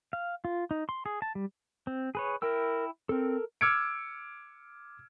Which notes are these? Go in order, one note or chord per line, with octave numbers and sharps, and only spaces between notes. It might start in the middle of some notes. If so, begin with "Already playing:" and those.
F5
F4
D#4
C6
G#4
A5
G3
C4
G#4 B4 C#5
E4 A#4 G5 E6
C4 A4 A#4
D6 E6 F6 G#6 C#7 D7